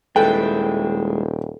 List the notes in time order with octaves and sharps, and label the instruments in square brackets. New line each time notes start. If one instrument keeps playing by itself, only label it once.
[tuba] D#1 [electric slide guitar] G#3 E4 [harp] A4 B4 [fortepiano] G5